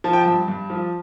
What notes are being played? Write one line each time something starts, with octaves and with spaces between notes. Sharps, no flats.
F3 A5
G5
G2 A5
G2
F3